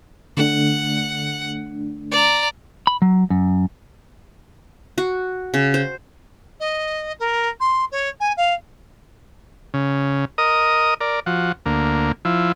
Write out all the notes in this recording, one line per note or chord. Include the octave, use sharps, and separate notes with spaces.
D3 A3 D4 F#5
D5 A#5
B5
F#3
F#2
F#4
C#3
C5
D#5
A#4
C6
C#5
G#5
F5
C#3
A#4 D#5 D#6
A#4 D5
F3 F#4
D2 A#3
F3 E4